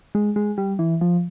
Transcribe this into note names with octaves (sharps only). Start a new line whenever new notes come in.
G#3
G#3
G3
E3
F3